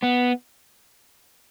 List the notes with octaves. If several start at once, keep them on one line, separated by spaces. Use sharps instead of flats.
B3